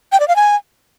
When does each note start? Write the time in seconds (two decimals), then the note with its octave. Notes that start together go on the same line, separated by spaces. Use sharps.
0.12 G5
0.20 D5
0.28 F5
0.36 G#5